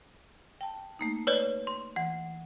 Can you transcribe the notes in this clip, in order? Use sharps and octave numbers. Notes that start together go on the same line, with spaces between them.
G5 A5
A3 A#3 D#4
B4 C#5 D5
C6
E3 F#5